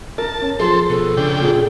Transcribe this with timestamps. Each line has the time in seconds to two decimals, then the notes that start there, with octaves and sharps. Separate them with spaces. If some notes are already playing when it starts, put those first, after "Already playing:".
0.18 A#4 A5
0.42 C#4
0.59 F3 G#4 A4 C5 C6
0.90 B2 A4
1.17 C#3 D4 G5
1.41 A#2 G#4